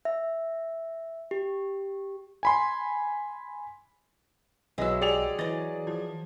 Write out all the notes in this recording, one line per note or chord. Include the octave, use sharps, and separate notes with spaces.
E5
G4
G#5 B5 C6
B1 F#3 G#3 B3 D#5 E5 E6
G4 G#4 D5 C#7 F7
E3 F#3 D#5 A6
F3